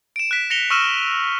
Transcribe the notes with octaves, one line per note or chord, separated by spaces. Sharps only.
D7 E7
F#6 B6
A#6 C#7 F7 G7
C#6 E6 F6 D#7 E7